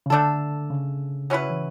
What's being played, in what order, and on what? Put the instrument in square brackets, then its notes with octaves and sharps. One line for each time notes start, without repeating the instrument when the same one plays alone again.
[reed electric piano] C#3
[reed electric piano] D3 [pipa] A3 D4 A4
[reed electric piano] C#3
[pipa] F#3 C#4 E4 B4
[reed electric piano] E3